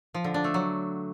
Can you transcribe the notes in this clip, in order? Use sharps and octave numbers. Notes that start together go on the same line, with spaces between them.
F3
D3
D4
A3
F#3